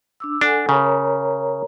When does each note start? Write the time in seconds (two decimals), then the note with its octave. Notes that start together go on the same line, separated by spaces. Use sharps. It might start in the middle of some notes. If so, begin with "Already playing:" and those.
0.20 D4 D6 E6
0.41 D4 A4 F#5 G#5
0.69 C#3 A#4 C#5 A#5